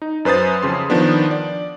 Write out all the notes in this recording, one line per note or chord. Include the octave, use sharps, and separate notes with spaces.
D#4
F#2 B4 C5 D#6 A6
F2 C#3 C6
D#3 F3 B3 D4
D5